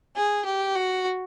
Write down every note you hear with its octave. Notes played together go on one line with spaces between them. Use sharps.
G#4
G4
F#4